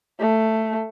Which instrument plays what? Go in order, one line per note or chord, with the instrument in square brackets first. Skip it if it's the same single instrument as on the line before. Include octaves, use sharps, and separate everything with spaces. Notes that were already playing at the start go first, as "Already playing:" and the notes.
[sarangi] A3